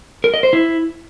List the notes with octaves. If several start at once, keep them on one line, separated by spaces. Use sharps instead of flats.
A#4
D#5
C5
E4